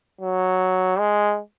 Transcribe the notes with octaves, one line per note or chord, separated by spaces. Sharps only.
F#3
G#3